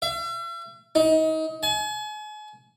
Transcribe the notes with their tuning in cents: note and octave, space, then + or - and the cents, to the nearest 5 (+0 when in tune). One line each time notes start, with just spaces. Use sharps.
E5 +45
D#4 +30
G#5 +40